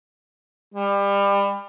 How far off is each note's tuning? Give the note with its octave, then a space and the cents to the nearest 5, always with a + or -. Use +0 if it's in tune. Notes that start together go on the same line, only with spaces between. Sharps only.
G3 +30